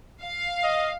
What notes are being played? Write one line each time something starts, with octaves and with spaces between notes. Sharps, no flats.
F5
D#5